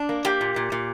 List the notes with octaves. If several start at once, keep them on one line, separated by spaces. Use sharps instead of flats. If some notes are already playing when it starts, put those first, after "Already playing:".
Already playing: D4
A#3
A#3 G4
A#2
A#2
A#2